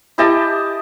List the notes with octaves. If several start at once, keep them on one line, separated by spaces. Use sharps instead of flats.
E4 G4 D#5 A5